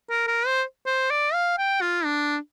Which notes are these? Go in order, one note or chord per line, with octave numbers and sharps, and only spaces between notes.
A#4
A#4
C5
C5
D5
F5
G5
F4
D4